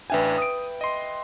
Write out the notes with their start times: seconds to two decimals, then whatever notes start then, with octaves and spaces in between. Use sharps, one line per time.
0.10 A1 D4 B4 E5 G5 G#5
0.38 D#6 D7
0.81 D#5 C6